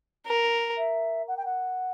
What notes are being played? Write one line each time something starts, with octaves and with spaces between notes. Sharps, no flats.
A#4
E5
F#5
G5
F#5